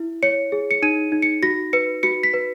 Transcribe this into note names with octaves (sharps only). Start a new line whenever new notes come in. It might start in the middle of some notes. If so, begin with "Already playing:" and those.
Already playing: E4
C#5 C#7
G#4
C#7
D#4 D#7
D#4
C#7
F#4 A#6
B4 C#7
F#4 C#7
B6
B4